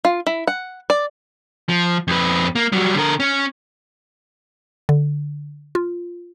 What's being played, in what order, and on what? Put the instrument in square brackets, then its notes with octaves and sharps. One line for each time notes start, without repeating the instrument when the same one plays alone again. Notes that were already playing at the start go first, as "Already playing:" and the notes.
[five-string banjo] F4
E4
F#5
D5
[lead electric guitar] F3
F2 B4
A#3
F#3 G3
D3 A#4
C#4
[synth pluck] D3
F4